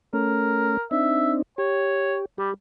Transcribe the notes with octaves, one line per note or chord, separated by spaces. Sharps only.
A3 C#4 A#4
C4 D4 D#4 E5
G4 C#5
G3 G4